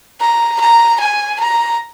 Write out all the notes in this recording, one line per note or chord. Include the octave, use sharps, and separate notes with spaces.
A#5
A#5
G#5
A#5